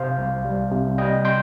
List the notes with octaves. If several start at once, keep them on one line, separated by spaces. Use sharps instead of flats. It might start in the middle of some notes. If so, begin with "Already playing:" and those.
Already playing: C3 C5 F5
C2
G3
C3
G3 D#5 G5
G5 C6